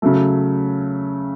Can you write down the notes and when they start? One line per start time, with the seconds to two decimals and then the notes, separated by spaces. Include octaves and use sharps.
0.02 C#3 F#3 A3